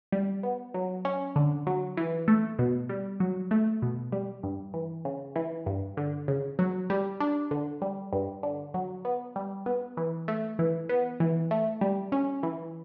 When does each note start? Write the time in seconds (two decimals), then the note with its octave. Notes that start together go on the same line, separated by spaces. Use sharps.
0.12 G3
0.43 B3
0.74 F#3
1.05 C#4
1.36 D3
1.67 F#3
1.97 E3
2.28 A3
2.59 B2
2.89 G3
3.20 F#3
3.51 A3
3.82 B2
4.12 G3
4.43 G2
4.74 E3
5.05 C#3
5.36 E3
5.66 G2
5.97 D3
6.28 C#3
6.59 F#3
6.90 G3
7.20 D4
7.51 D3
7.82 G3
8.13 G2
8.43 D3
8.74 F#3
9.05 B3
9.36 G3
9.66 B3
9.97 E3
10.28 A3
10.59 E3
10.89 B3
11.20 E3
11.51 A3
11.81 G3
12.12 C#4
12.43 E3